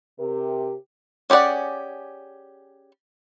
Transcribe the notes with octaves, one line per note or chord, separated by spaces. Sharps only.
C3 G4 A#4
C#4 G4 G#4 D5 F#5